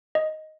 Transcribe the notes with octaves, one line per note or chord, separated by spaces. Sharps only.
D#5